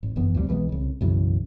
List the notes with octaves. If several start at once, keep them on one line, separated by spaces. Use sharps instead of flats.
G#1
G1 F#2 E3 B3
D2 C3 E3 G3
B1 E3 G#3 B3
C2 C#3
B1 F#2 C#3 E3